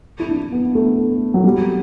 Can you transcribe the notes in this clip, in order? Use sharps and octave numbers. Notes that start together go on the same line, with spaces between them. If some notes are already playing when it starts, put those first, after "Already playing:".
E4
D4
B3
A3
F#3
G3